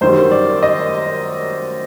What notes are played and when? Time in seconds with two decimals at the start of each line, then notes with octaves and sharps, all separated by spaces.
0.01 F#2 D#3 G3 C5
0.32 D5
0.63 D#5